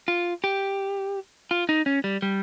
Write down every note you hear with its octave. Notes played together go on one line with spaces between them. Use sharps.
F4
G4
F4
D#4
C#4
G3
G3